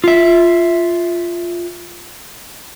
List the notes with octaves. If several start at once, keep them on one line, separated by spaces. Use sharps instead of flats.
F4 E5